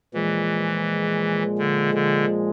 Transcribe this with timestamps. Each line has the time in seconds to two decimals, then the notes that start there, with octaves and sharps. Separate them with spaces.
0.14 A#2 E3 F3 G#3
1.59 D3
1.94 D3